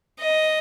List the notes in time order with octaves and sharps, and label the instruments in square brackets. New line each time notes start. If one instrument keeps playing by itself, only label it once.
[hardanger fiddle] D#5